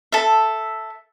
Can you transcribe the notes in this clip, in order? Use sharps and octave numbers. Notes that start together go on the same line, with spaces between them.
A4 E5